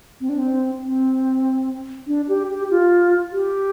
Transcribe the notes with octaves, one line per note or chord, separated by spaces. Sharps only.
C4
D4
C4
C4
D4
G4
G4
F4
G4